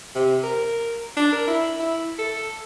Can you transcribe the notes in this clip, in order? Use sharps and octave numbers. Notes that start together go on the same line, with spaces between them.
C3
A#4
D4
A#4
E4
E4
A4